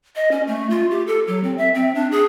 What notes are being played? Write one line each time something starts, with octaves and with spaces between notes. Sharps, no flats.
D#5
C#4
A3
F4
G4
A4
F#3
C4
E5
C4
D4
G#4